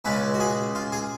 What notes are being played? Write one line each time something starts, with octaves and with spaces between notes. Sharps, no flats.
C#2 C#3 G#3 C#4 B4
F#4
G#4
F4
G#4